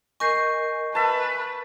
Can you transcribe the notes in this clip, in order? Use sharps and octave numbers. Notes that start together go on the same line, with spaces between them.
A#4 D#5 G#5 C#6 G6 C7
B4 E5 A5